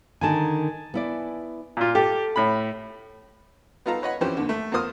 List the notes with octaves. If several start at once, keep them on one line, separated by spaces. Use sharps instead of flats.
D3 D#3 A#4 G#5 A5
B3 E4 D5
A#2 F4
G4 A4
A2 B5
B3 D#4 F4 A4 F5 A#5
B4 C#5 D#5 F#5 B5
E3 F3 C4 C#4 G4 C5
D#2 D3
A3
E2 F4 A#4 C5 D#6 F6